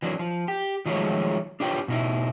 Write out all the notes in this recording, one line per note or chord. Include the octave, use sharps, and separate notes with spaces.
E3 F#3 D4
F3
G4
D#3 F3 F#3 G#3 A3 C#5
D4 F4 G4 B4 C#5 G5
B2 D#4 E4